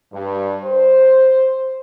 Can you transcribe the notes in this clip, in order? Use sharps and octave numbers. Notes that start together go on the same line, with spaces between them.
G2
C5